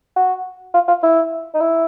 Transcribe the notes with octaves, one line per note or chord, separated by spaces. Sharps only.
F#4
F4
F4
E4
D#4
E4